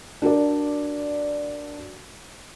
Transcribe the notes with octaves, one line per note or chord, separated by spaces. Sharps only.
D4 F#4 A#4 D5